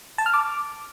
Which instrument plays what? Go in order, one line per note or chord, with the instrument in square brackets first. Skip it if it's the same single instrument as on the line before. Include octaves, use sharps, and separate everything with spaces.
[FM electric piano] A5
F6
D6